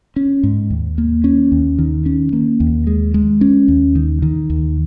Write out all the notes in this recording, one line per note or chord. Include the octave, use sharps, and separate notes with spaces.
C#4
G#2
D#2
A#3
C#4
D#2
D#3
C#4
A#3
D#2
G#3
G#3
C#4
D#2
D#3
D#3
D#2